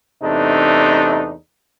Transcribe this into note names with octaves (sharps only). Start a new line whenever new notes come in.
E2 C3 A3 D4 D#4